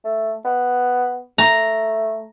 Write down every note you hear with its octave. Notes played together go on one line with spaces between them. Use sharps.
A3
B3
A3 A#5